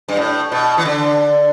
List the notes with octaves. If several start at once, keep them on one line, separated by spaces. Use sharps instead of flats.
G2
A2
B2
E3
D3